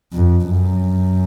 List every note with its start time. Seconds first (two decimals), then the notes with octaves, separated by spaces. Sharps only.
0.14 F2
0.51 F#2